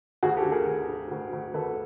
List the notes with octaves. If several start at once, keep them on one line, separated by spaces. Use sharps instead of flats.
D2 F#4 G#4
G4 A4
D3
G#4 A#4
D2
D2
D2
D2
D2 A4 B4